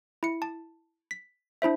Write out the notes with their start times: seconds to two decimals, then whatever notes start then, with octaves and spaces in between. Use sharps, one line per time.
0.23 E4 C#7
0.42 A5
1.11 B6
1.62 D4 E4 C5 E5